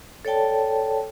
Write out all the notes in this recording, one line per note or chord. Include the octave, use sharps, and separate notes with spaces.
A4 C#5 D5 G5 A5